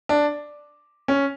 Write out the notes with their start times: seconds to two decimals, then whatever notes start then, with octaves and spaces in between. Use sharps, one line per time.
0.09 D4
1.08 C#4